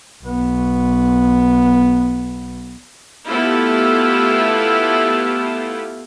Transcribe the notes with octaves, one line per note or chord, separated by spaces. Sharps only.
B1 B3
A3 B3 E4 F4 G4 A4